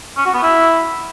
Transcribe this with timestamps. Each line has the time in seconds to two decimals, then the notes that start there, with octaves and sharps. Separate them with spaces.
0.17 C#4
0.25 F#4
0.34 B3
0.43 E4